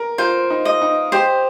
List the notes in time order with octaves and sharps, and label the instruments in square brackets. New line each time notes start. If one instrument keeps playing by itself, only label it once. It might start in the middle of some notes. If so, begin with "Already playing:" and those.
Already playing: [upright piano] A#4 [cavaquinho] A#5
[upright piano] F4 [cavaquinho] C5
[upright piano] D#4
[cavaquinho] D#5
[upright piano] D#4
[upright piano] G4 [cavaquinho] C5